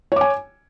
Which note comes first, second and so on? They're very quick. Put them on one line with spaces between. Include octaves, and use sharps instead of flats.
C#5 D6 G#5